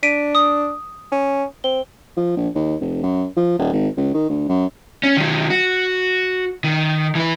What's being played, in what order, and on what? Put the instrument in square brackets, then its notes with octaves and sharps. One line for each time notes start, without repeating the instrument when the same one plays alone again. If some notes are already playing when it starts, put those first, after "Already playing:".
[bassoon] D4 [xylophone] B6 D7 D#7
[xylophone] D#6
[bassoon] C#4
[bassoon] C4 [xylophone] G7
[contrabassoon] F3
A#1
D#2
F1
F#2
F3
D#1
G#1
C#2
D#3
D2
F#2
[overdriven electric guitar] C#4
D#3 F#3
F#4
D#3
E3 B4